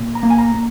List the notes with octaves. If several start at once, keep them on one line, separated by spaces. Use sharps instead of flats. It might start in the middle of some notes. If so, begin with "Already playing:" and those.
Already playing: A#2
A#5
A#3
G#5
A#5
A#3